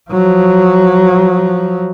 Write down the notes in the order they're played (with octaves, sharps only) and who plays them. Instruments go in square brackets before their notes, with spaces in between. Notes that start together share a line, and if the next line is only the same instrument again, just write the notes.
[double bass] F3 F#3